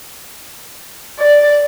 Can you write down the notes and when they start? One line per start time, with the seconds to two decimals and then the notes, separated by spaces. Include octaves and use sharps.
1.19 D5